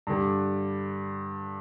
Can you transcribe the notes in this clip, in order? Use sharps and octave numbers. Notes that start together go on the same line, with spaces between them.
G2 D3 G3